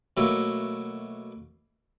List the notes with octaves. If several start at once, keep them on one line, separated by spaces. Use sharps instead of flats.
B2 F#3 A3 A#3 E4 E5